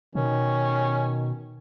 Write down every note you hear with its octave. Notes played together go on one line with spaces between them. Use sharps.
B2 D#3 C#4